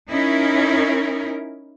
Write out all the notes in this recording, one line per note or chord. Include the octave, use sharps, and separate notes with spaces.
C#4 D#4 E4 A#4